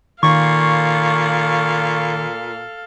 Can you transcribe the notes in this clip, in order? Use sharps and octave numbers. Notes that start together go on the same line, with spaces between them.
A#2 D#3 A4 F5 C#6